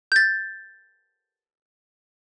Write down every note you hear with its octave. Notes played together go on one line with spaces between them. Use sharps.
G6 A6